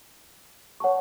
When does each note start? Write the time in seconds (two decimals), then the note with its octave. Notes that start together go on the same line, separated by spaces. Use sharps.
0.80 C#5 F#5 A5 C#6